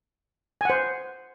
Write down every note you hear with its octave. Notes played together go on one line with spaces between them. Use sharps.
C5 F#5 G#5